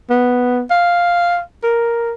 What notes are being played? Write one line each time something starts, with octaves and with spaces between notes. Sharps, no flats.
B3
F5
A#4